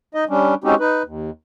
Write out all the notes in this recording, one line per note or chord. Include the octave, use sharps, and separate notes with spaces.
D#4 D#5
G3 C#4 D4
G#3 C4 C#4 D#4 F#4 G4
D#4 B4
D#2